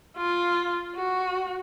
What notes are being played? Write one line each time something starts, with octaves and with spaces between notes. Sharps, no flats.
F4
F#4